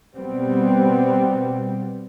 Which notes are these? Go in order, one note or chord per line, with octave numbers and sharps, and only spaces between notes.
B2 G3 B3 C4